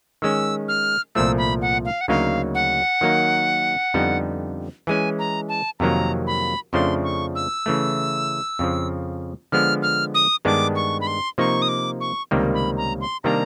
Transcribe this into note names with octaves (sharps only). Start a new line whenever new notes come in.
D#3 G#3 C#4 E6
F6
C2 A#2 F3 A3 E6
B5
F#5
F5
F#5
D2 C#3 F#3 A#3 D#4 F5
F#5
D#3 F#3 A#3 D#4
F2 D3 G3 B3 D#4
E3 G#3 C#4 G#5
A#5
A5
F2 C3 D#3 F#3 A#3 A#5
B5
F2 C#3 F3 A3 D4 C6
C#6
E6
C#3 E3 A3
F2 C#3 F3
D3 F3 G#3 B3 F6
F6
D#6
G2 D#3 G#3 B3 D4 D6
C#6
B5
C6
C3 F3 A#3 D#4 C#6
D#6
D6
C#6
C#2 C3 D#3 G3 A#3
B5
A#5
C6
C3 D#3 G3 A#3 D4 A#5